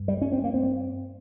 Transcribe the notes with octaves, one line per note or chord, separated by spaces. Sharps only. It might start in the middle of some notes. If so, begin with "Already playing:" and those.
Already playing: G2
G3
C#4
C4
A#3
C4